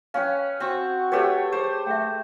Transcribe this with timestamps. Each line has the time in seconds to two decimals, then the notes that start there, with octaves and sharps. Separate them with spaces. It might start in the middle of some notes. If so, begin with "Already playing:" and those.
0.14 C#4 B4 F5 G5
0.60 C4 F#4 C#6
1.12 A3 G4 B4 C#5
1.52 G#4 C5
1.87 A3 E5 G5